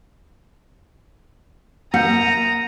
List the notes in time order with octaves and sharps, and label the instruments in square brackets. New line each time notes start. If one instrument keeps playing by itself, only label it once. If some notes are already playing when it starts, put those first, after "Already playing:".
[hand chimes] A#3 G6 [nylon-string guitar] F#5 [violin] A#5 D#6